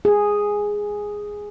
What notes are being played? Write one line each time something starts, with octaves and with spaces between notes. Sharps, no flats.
G#4